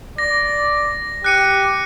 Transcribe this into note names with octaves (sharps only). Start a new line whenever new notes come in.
D5 A#6
G4 F#6 C#7 D#7